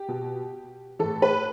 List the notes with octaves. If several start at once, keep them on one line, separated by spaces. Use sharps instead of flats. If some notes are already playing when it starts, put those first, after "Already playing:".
Already playing: G4
B2
A2 E3 A4
B4